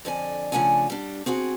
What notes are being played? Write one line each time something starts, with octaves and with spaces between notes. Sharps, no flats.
F2 D3 D5 G#5
C#3 F3 A3 D4 F#5 G#5
G3 D4
C4 F#4 G#4 F#5